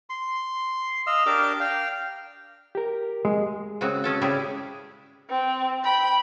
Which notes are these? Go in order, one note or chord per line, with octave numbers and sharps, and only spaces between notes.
C6
D#5 F5 E6
D4 G4 A#4 D6
F5 G5
G4 A#4
G#3
C#3 G#3 C4 F#4
G#3 C#4 A4
C#3 G3 E4 G4 G#4
C4
G5 B5